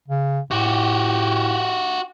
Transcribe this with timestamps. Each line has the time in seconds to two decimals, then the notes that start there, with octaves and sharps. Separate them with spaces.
0.08 C#3
0.51 A2 F#4 G4